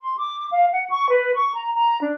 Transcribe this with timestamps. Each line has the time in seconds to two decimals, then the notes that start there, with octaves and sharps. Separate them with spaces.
0.01 C6
0.18 D6
0.51 F5
0.74 F#5
0.90 C#6
1.09 B4
1.35 C#6
1.54 A#5
1.74 A#5
2.01 D4